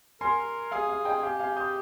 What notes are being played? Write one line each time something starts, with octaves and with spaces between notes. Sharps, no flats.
A#4 G#5 C6
G#4 F5 G#5
F5
D#5 G5
G4 F5 G#5
F5 G#5
D#6 G6